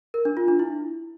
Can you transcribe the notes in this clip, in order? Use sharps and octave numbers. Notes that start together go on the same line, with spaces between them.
A#4
D4
F4
D4
E4